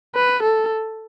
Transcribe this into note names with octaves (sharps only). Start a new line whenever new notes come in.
B4
A4